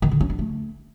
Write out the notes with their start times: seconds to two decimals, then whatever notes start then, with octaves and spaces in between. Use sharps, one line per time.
0.02 D#3
0.11 D3
0.21 C#4
0.30 D4
0.39 A3